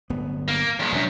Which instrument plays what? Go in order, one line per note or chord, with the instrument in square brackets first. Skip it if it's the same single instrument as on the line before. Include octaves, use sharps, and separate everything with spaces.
[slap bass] D1 G1 B3
[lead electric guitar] A#3
E2 G#3
[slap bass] E1 D4 [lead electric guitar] F#2